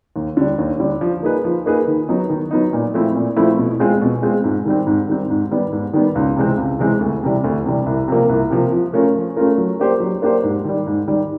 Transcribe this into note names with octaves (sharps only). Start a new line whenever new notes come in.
D#2
D3 G3
D#2
D3 G3
F3
A#3 D#4 G#4 B4
F3
A#3 D#4 G#4 B4
D#3
F#3 B3 D#4
D#3
F#3 B3 D#4
A#2
F3 A3 C4 E4
A#2
F3 A3 C4 E4
B2
G#3 C4 F4 G#4
B2
G#3 C4 F4 G#4
G#2
D#3 G3 C4
G#2
D#3 G3 C4
G#2
D#3 G3 B3
G#2
D#3 G3 B3
C#2
C3 E3 G#3 C4
C#2
C3 E3 G#3 C4
D2
C3 E3 G3
D2
C3 E3 G3
C2
C3 F3 A#3
C2
C3 F3 A#3
F3
A3 C#4 F4 A#4
F3
A3 C#4 F4 A#4
F#3
A#3 D4 G4 C5
F#3
A#3 D4 G4 C5
G#2
D#3 G3
G#2
D#3 G3